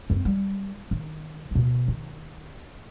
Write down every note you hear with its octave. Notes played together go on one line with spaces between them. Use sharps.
F#2 C4
G3
D#3
D2 B2
D#3